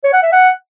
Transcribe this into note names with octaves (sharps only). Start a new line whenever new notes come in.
C#5
F#5
E5
F#5